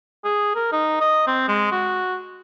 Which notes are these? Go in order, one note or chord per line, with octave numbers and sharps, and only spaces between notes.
G#4
A#4
D#4
D#5
C4
G#3
F#4